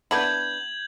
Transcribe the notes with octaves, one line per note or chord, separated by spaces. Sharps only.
B3 D4 E4 G6 G#6 F#7